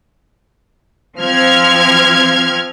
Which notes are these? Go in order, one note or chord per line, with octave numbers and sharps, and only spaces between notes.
F3 C4 F6 G#6